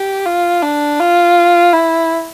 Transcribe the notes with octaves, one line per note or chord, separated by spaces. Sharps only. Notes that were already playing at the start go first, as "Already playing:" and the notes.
Already playing: G4
F4
D4
F4
E4